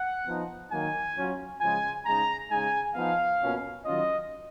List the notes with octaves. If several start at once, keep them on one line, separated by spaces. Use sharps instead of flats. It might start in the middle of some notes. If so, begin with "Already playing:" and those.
Already playing: F#5
F3 B3 D#4
D#3 F#3 A#3 D#4 G#5
F#3 C#4 F4
C#3 F3 G#3 G#5
C#3 G#3 D#4 A#5
C#3 G#3 D#4 G#5
F3 B3 D#4 F5
B2 A#3 C#4 F4
D#3 F#3 C#4 F4 D#5